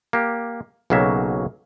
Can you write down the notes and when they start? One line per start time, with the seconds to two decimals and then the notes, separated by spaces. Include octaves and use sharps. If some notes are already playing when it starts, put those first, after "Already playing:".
0.13 A#3 G4
0.90 B1 C#3 F#3 A#3 E5